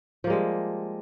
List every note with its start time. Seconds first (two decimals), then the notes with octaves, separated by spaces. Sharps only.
0.24 F3
0.27 A#3
0.30 G#3
0.33 G3